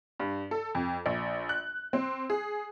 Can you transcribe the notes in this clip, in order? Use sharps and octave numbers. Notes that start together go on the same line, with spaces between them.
G2
A4
F2
A#1
F#6
C4
G#4